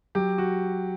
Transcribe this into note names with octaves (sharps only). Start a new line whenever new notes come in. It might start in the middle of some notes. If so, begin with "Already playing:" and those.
F#3 G4
F#4